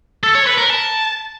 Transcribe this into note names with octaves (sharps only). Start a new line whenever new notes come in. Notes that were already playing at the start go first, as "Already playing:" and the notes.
A4
C#5
B4
A#4
A5